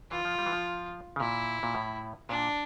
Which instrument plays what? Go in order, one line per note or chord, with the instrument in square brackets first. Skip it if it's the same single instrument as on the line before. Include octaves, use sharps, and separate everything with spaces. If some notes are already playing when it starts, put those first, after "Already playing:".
[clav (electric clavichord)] E3 [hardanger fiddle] F4
[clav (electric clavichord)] F3
G3
E3
F3
C#3
[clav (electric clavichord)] A#2 [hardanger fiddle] E4
[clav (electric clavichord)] A#2
A2
[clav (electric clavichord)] A#2 [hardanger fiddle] D4